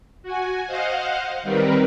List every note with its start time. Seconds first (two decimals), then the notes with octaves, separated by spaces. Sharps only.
0.23 F#4 G#5
0.67 C5 D#5 F5 F#5
1.43 D#3 G3 C4 A#4 B4